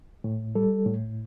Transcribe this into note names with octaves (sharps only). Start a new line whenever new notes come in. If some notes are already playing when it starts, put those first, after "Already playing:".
A2
G3 A4
A2